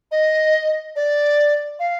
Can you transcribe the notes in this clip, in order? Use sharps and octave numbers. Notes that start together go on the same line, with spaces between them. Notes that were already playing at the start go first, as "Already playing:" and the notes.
D#5
D5
F5